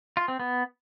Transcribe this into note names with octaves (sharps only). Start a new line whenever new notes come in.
F4
C4
B3